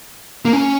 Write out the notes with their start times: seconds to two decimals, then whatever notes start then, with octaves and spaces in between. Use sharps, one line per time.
0.45 A#3
0.53 C#4